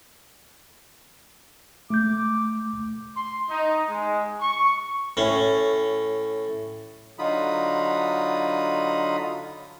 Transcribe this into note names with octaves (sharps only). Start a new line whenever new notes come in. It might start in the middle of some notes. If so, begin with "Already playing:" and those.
A3 D6 G6
C6
D#4
G#3
C#6
A2 C#4
D3 F#3 D#4 F4 B5 D#6